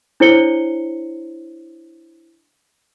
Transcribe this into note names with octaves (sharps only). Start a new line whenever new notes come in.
D4 E4 C5 C#5 C#7 G7